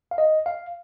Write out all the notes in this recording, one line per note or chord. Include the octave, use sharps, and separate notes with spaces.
F5
D#5
F5